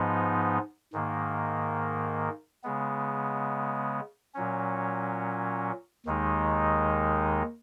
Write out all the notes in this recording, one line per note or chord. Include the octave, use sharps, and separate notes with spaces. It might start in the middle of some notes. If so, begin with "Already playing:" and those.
Already playing: G#2 F3 B3 D#4
G#2 D#3 A#3
C#3 G#3 B3
A#2 F#3 C#4
D#2 D#3 G#3 D#4